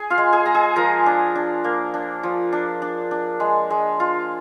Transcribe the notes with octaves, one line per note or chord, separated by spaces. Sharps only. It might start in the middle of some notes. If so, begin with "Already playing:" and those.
Already playing: G#4
F4 F5
G#3
G#4 G#5
G#3 A#5
G#4 G#5
F3 A#4 A#5
D4
D4
A#3
D4
F3
D4
D4
D4
G#3
G#3
F4